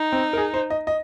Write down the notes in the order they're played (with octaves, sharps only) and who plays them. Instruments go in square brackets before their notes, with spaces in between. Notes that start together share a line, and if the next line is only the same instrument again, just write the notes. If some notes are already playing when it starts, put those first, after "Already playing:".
Already playing: [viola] D#4
[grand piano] C4
A#4
G#4
C5
D#5
D#5